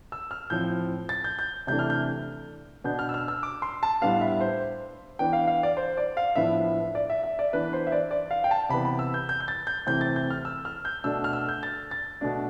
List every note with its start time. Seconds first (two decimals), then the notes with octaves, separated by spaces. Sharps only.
0.12 E6
0.31 F6
0.50 A2 F3 C4 G6
1.09 A6
1.24 G6
1.39 G6
1.67 C3 E3 A3 D4 G6
1.79 F6
1.90 G6
2.84 B2 B3 D4 G6
2.99 F6
3.09 E6
3.14 F6
3.28 E6
3.43 D6
3.62 C6
3.83 A5
4.01 A2 G3 B3 D4 F5
4.21 E5
4.41 C5
5.19 E3 B3 D4 G5
5.33 F5
5.47 F5
5.63 D5
5.77 C5
5.97 D5
6.17 F5
6.36 A2 F3 B3 D4 E5
6.95 D5
7.10 E5
7.24 E5
7.39 D5
7.53 E3 B3 D4 B4
7.73 C5
7.87 E5
7.92 D5
8.11 D5
8.31 F5
8.44 G5
8.51 A5
8.69 C3 E3 B3 B5
8.85 B5
8.99 E6
9.14 G6
9.29 G6
9.40 G6
9.48 A6
9.67 G6
9.86 C3 E3 A3 C4 G6
10.01 A6
10.16 G6
10.30 F6
10.45 E6
10.65 F6
10.85 G6
11.04 B2 A3 D4 E6
11.24 F6
11.33 E6
11.48 G6
11.63 A6
11.91 A6
12.21 B2 A3 D4